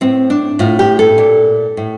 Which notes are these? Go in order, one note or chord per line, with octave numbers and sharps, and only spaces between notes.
A2 C4
D4
A2 F4
G4
A4
A#2
A2